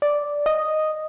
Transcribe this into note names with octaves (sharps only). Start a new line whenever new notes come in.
D5
D#5